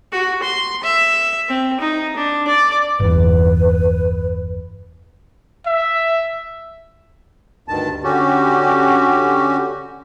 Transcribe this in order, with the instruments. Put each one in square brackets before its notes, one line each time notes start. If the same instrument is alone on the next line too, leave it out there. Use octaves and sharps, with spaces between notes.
[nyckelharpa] F#4
C6
E5
C4
D#4
D4
D5
[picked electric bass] G1 E2 [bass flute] B4
[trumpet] E5
[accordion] D2 G2 D#3 A5
D3 C#4 F#4 G4